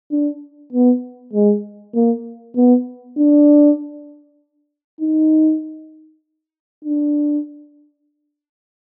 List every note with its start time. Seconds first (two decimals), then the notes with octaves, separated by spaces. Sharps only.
0.11 D4
0.72 B3
1.33 G#3
1.95 A#3
2.56 B3
3.17 D4
5.01 D#4
6.85 D4